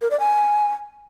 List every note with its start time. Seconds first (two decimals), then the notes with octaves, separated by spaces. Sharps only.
0.02 A#4
0.11 D5
0.20 G#5